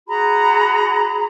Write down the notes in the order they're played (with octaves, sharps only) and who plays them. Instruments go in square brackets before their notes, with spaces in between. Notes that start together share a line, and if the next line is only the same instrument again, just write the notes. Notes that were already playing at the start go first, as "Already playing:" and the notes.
[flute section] F#4 G#4 A#5 B5